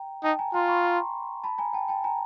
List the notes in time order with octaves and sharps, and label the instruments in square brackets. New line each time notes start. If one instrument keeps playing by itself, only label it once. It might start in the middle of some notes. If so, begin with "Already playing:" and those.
Already playing: [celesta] G5 A#5
[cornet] D#4 [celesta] G5 A5
[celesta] G#5 A#5
[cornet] F4 [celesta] A#5 C6
[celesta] B5 C#6
A#5 C6
A5 B5
G#5 A#5
G5 A5
G5 A5
G#5 A#5